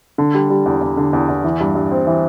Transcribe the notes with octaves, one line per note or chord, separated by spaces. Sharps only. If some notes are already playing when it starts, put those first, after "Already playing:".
D3
G3
G3
E2
E2
D3
E2
E2
E3
G2
G2
C4
E3